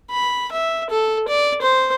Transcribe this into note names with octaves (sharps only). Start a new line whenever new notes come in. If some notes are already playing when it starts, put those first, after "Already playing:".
B5
E5
A4
D5
C5